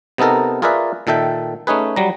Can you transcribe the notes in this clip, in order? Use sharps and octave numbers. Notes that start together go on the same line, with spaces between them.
C3 B3 D#4 A4 A#4
F4 G#4 A#4 B4 D5 E5
A#2 D#3 A4 E5 G5
A3 C#4 D#4 G#4 B4
F#3 G3 A#5